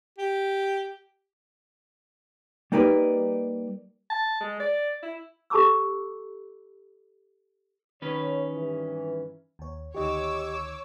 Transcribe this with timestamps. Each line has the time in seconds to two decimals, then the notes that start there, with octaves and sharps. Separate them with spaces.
0.18 G4
2.72 G3 A#3 D#4 A#4 B4 D5
4.10 A5
4.41 G#3
4.60 D5
5.03 E4
5.50 G4 A4 A5 B5 D6 E6
8.02 D#3 C#4 B4 C#5
8.53 G2 E3
9.59 D#2 C#5
9.95 D2 D#3 G4 C#5 D#5 D6 E6